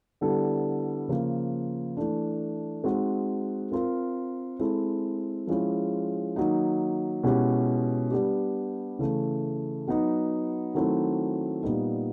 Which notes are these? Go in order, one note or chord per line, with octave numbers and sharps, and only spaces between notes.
D3 G3 B3 E4 A4
C#3 F3 A#3
E3 A3 D4
G#3 C4 D#4 F#4
C4 F4 A#4
G#3 C4 E4 A4
F3 G#3 C#4 E4 G#4
D#3 F#3 A#3 D#4
B2 G#3 C#4 E4 G4
G3 B3 D4 G4
C#3 E3 A3
F#3 B3 D#4
D#3 F#3 A3 C4 E4
A#2 G3 B3 D#4